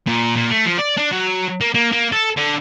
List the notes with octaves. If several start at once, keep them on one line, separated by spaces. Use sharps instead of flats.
A#2
A#2
A3
F3
D5
D4
F#3
A#3
A#3
A#3
A4
D3